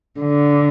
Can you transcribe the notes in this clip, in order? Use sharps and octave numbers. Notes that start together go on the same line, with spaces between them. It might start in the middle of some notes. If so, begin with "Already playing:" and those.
D3